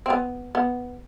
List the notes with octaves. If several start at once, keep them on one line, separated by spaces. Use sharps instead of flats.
C4
B3
B3